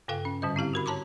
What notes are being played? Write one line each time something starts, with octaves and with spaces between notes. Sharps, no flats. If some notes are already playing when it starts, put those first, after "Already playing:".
G2 C#3 A4 F5 G5
C#4
G#2 D3 G3 D#5
C4 E4 G4 F5
F#4 A#4 B5
C#5 A5 A#5 C6 D6